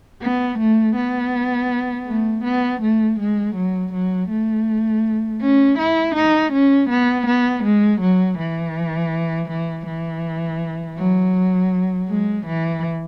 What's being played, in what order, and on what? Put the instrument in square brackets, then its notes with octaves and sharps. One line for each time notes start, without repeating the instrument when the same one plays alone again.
[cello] B3
A3
B3
A3
B3
A3
G#3
F#3
F#3
A3
C#4
E4
D#4
C#4
B3
B3
G#3
F#3
E3
E3
E3
F#3
G#3
E3